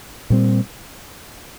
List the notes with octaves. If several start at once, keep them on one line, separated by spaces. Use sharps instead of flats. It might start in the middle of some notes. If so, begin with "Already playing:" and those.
A#2 G3 C4